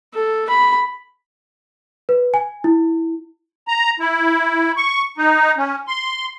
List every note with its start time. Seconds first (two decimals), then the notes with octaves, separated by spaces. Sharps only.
0.14 A4
0.50 B5
2.09 B4
2.34 G#5
2.64 E4
3.68 A#5
4.00 E4
4.77 C#6
5.18 D#4
5.57 C#4
5.87 C6